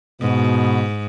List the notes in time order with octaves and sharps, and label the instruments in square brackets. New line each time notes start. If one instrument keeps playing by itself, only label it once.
[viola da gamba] G#2 [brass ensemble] B2